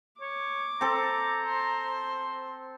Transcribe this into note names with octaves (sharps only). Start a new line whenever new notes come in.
C#5 D6
C4 A4 A#5
C5